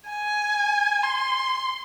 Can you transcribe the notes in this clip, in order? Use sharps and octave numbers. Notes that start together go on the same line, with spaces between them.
G#5
C6